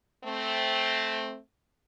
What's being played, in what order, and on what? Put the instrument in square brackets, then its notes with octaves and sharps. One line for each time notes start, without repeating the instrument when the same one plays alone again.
[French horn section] A3 C4